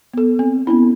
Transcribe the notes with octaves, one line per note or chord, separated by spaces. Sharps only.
B3 A4
C4
B3 C#4 E4